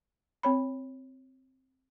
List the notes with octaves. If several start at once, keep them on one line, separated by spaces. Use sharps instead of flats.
C4 C#5 B5